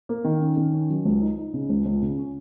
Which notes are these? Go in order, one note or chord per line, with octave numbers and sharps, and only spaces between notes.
A#3
D#3
C#4
D#3
C#4
F#3
C#2
D#4
D#4
C#3
C#2
C#2
C#3
C#4